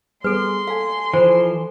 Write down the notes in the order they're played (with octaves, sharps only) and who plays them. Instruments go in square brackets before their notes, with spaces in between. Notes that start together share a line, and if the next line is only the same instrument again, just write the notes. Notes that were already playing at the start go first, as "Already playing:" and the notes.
[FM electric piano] G3 B3 G#4 [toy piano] A4 B4 [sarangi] C6
[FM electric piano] A4 G#5 [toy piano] F5
[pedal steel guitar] E3 F3 [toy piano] C5